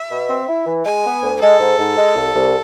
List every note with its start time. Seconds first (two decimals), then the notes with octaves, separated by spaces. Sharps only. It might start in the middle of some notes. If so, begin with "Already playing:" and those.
Already playing: E5
0.11 B2
0.29 C4
0.48 E4
0.66 E3
0.85 G#3 G#5
1.04 B3
1.23 D2
1.41 G#3 A4
1.60 G#2
1.78 G#2
1.97 G#3
2.15 C2
2.34 C2